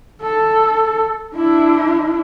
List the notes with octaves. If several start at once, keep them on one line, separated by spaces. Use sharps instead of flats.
A4
D4 E4